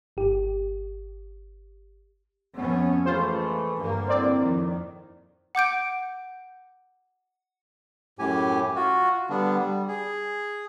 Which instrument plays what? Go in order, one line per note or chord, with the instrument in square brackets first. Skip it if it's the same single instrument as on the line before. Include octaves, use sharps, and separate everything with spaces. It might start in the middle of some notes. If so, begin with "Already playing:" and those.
[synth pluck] G1 G4
[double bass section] F2 A3 C#4 [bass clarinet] B3
[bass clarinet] E3 [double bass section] G#3 A3 [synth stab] F4 C5
[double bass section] G2 D3 A#3
[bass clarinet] A2 [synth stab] C4 D5
[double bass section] F2 D#3
[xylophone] F#5 D6 G6 D7
[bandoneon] F#2 A2 G4 G#5
F4 F#4
D3 G3 B3 D4
G3
G#4